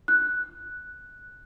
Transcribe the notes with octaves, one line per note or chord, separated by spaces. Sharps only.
F#6